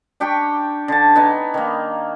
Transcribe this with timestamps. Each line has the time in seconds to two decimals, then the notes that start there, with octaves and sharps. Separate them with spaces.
0.20 D4 G4 G5 C#6
0.88 D3 A5
1.16 B3 D#4 G#5
1.54 D#3 A#3